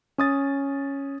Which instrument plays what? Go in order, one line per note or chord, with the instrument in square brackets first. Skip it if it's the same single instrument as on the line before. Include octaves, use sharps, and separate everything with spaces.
[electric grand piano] C#4 D#6 A6